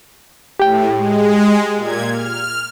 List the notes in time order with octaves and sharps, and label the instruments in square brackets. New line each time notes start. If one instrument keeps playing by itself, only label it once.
[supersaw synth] A2 [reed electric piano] G4 G5
[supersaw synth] G#3
A#2 G#6
F6